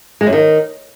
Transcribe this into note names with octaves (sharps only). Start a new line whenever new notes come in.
G#3
F#2
D#3